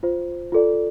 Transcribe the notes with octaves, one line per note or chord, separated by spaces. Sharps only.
F4 C5
F4 A4 D5